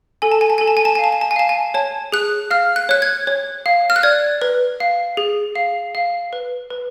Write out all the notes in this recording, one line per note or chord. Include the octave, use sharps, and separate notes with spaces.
A4 G#5
A5
G#5
A5
A4 G#5
A5
G#5
A5
F5 G#5
A5
G#5
A5
G#5
F5 A5
G#5
C#5 A5
G#4 F#6
F5 F6
F#6
C#5 F#6
G#6
C#5
F5
F6
F#6
D5 G#6
B4
F5
G#4
F5
F5
B4
B4